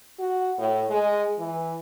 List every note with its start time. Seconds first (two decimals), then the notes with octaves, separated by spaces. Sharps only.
0.19 F#4
0.58 A2
0.90 G#3
1.38 E3